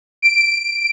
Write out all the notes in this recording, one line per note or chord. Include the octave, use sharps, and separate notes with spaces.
D7